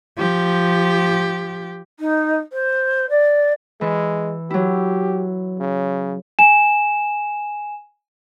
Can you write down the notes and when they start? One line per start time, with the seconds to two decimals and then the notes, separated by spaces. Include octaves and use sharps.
0.17 F3 G4
1.99 D#4
2.52 C5
3.10 D5
3.81 E3 G#3 B4
4.50 F#3 E4 G4
5.60 C#3
6.39 G#5 E7